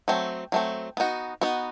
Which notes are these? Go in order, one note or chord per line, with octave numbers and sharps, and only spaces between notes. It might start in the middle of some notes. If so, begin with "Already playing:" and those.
F#3 A3 C4
F#3 A3 C4
B3 D#4 F#4
B3 D#4 F#4